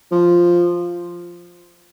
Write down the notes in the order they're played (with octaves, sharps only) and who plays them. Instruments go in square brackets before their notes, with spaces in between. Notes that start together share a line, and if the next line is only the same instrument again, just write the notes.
[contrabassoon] F3